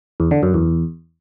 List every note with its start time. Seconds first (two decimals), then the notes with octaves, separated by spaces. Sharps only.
0.20 E2
0.31 D3
0.43 F#2
0.54 E2